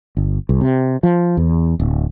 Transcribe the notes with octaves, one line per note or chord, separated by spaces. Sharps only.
G1
C2
C3
F3
E2
D1